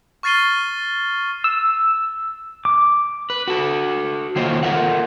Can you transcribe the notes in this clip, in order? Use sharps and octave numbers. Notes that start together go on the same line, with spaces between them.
C#6 F6 A6 C7 D#7 G7
E6
D6
B4
F#4 A4
D#3 A#3 F4 C5 C#5 D#5
F4 A4 A#4 E5 F#5